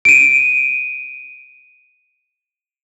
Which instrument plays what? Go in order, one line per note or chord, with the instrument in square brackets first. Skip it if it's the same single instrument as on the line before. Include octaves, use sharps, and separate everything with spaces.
[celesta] D7 D#7